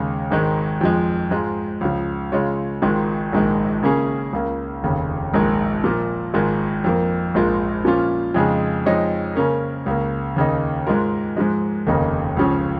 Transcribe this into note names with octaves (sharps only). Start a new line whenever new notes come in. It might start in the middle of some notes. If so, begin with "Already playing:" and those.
Already playing: D#2 C#3 G#3
G#1 G#2 D#3 G#3
F2 F3 G#3
G#2 G#3 F4
C#2 C#3 F3
C#3 G#3 F4 C#5
G#1 G#2 D#3 G#3 F4
A#1 G#2 D#3 G#3
C#3 A#3 C#4 G#4
C#2 C#3 A#3
F1 D#2 C#3
A#1 G#2 D#3 G#3
A#2 F3 A#3 F4
G#1 G#2 G#3 F4 A#4
F2 F3 A#3
A#1 G#2 G#3 F4 A#4
A#2 F3 C#4 F4
F2 C#3 G#3 D#4 G#4
F2 F3 G#3 D#4 C#5
C#3 A#3 C#4 A#4
C#2 C#3 A#3
D#2 C#3 A#3 D#4
G#2 G#3 F4 A#4
G#2 F3 G#3
F1 D#2 C#3 A#3 D#4
C#2 C#3 F3 C#4